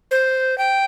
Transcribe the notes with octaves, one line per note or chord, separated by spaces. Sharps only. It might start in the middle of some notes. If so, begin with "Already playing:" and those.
C5
G5